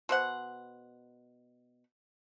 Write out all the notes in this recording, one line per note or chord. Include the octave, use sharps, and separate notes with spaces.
B2 C5 F#5